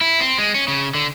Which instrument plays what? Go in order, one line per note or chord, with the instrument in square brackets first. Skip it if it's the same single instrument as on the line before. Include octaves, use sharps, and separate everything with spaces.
[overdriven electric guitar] E4
C4
G#3
C#4
C#3
D3